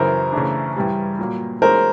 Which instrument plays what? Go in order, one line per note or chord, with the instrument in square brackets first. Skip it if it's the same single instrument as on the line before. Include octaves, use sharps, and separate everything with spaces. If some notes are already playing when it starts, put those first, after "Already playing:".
Already playing: [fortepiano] F#2 C#3 E3 [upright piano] A#4 C5
[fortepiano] C#3 E3 A3 D4
G2 E3 G3
A#2 F#3 A#3
[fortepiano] E3 G#3 C#4 F#4 [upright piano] A#4 C5